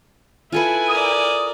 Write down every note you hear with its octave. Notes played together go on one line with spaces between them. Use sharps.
E4 F4 A4 B4 G#5
A#4 D5 D#6